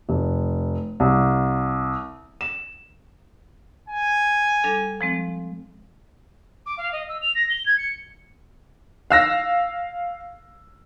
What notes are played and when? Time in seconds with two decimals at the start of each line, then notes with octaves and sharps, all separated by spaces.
0.09 F1
1.00 C2
2.41 E7
3.89 G#5
4.64 G3 D4 A4
5.01 F3 G#3 C4
6.66 D6
6.77 F5
6.92 D#5
7.08 E6
7.21 F7
7.35 A#6
7.50 G7
7.65 G#6
7.78 C#7
9.10 F5 E6 A#6